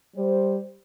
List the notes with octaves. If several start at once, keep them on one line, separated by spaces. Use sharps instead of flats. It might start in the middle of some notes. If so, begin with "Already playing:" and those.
G3 C5